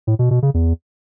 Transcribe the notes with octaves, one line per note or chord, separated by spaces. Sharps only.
A2
B2
B2
C#3
E2